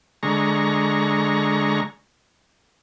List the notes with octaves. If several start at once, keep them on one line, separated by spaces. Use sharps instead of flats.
D3 G#3 A#5 C#6